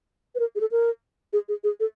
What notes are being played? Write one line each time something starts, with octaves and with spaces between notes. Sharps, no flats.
B4
A#4
G#4
A4
A#4
G#4
G#4
G#4
A4